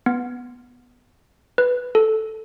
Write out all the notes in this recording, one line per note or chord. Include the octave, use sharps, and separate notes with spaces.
B3
B4
A4